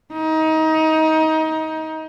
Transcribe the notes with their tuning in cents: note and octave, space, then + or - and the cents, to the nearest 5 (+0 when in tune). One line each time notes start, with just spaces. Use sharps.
D#4 +25